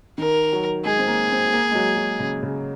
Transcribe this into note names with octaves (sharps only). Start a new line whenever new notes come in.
D#3 A#4
F#3
G#3 G#4
C4
A#3
C4
A#3
G#3
F#3
F#3
C#3
C#3